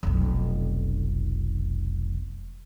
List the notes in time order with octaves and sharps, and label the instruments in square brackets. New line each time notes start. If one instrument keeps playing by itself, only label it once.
[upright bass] F1 B1